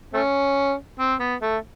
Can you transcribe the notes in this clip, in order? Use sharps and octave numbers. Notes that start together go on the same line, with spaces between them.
A3 C#4
C4
B3
A3